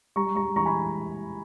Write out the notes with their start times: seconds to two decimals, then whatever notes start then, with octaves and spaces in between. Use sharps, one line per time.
0.16 G3 A#5 C#6
0.35 G3 A#5 C#6
0.56 E3 A#5 C#6
0.66 G#5 B5